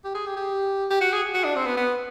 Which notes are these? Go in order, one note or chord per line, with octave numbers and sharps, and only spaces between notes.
G4
G#4
G4
G4
G4
F#4
G#4
F#4
D4
C4
B3
B3